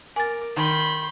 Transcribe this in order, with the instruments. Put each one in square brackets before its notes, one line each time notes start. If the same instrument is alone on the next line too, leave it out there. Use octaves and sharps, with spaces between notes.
[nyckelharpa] A#4 D6 [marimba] G#5 A6
[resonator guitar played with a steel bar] D#3 [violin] B5 G6 [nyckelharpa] C6